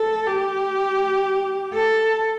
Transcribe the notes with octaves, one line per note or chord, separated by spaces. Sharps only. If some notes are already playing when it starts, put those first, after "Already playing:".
Already playing: A4
G4
A4